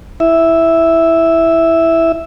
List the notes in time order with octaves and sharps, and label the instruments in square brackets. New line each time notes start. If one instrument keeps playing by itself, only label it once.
[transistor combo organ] E4 E5